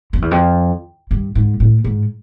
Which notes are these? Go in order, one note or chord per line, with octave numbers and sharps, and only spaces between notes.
F2
E2
F2
G2
G#2
A2
G#2